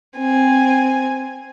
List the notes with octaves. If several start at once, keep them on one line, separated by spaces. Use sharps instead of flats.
C4 G#5